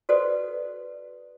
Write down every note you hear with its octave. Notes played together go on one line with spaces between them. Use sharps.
F#4 A4 B4 C5 D5 D#5